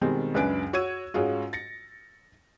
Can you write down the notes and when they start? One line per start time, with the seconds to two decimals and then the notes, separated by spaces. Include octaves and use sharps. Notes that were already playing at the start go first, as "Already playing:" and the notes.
0.01 B2 D#3 G3 G#3 C4
0.34 C#2 F#2 D4 B4 G#5 D7
0.73 F#4 C#5 C#6 E6 G#6 D#7
1.14 G#2 G#3 C#4 F4 F#4
1.53 A6 A#6 C#7